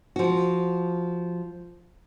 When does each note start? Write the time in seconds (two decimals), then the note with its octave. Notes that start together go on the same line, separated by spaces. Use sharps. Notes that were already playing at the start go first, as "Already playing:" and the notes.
0.16 F3 F#4